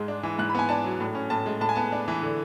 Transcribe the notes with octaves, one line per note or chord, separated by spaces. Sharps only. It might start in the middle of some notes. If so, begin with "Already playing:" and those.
Already playing: G#2 G#3
D4
E3
G#2 F#6
B5
B3 G#5
D4 A5
F#3
A2
C#4
A2 A5
G#3
A2 A5
G#5
B3 A5
D4
E3
D3